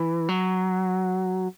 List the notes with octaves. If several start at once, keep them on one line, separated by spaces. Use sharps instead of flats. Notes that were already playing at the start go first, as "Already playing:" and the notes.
Already playing: E3
F#3